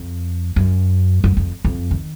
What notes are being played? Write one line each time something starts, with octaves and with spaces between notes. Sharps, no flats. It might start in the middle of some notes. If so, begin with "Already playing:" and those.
Already playing: F2
F#2
F#2
F2
F2
D#3